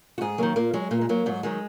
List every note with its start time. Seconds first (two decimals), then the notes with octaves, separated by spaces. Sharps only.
0.18 F#4
0.21 G#2 G#4
0.38 D#3 F#3 A#3
0.56 A#2 A#3
0.74 F#3 G#3
0.91 A#2 A#3
1.01 G#3
1.09 F#3 A#3
1.26 G#2 F#3
1.43 D#3 F#3 G#3